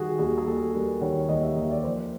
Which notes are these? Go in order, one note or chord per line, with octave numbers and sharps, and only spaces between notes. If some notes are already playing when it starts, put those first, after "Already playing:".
Already playing: D#3 G3 F#4 G#4
D#2 G#4
G#4
D#2 A4
G3 A#4
D#3 C#5
D#2 D#5
E5
D#2 E5
D5
F3 C5